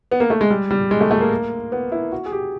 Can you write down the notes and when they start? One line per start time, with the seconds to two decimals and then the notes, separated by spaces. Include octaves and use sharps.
0.11 B3
0.20 A#3
0.30 A3
0.41 G#3
0.50 G3
0.71 G3
0.91 G#3
1.01 A3
1.11 A3
1.21 A#3
1.72 B3
1.92 E4
2.12 F#4
2.26 G#4
2.32 G4